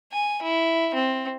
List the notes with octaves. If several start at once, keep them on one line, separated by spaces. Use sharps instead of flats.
G#5
E4
C4